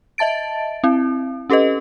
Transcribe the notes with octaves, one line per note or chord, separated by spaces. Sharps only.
D#5 E5 A5 A6 D7
C4 E4
C#4 G4 A4 B4 D#5